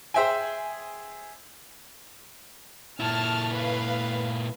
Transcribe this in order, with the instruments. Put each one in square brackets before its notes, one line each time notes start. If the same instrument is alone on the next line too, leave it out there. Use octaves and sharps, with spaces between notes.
[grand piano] G#4 C5 E5 G5 G#5
[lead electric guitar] A#2 E4 [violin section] A5 F6
[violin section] B4 F5